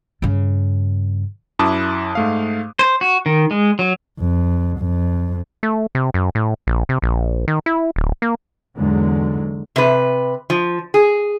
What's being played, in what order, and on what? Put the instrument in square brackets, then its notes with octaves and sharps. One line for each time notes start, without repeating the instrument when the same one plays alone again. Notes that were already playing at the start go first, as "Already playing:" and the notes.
[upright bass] G2 C#3
[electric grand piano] F#2 E4 A5 D6 D#6 F#6
G#2 A3 F5
[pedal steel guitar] C5
F#4
D#3
G#3
F#3
[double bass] F2
F2
[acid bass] A3
C3
F#2
A2
A#1
C3
A#1
D#3
E4
D1
A#3
[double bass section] E2 G#2 D3 F#3 G#3
[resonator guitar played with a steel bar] C3 B4
F3
G#4